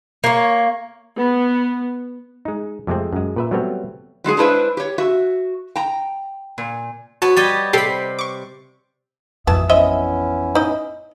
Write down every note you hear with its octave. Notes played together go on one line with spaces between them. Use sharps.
A#3 C#5
B3
G#3 D#4
F2 C3 G#3 A3 C4
F#2 G#3
A#2 B4 E5
F#3 G3 A3 B3 C4 C#5
F#3 G#3 F4 G#4
G#3 D4 E4 B4 C5 E5
G4 C#5
F#4 E5
G5 A#5
A#2
B3 F#4 C#5 A5
G3 G4 D#5 G#6 A6
C3 G4 A4 B5 C7 D7
C#6 D6
A1 F2 B2 E3 E5 A5 D#6
B3 C#4 E4 C5 D#5 E5
D#4 D#5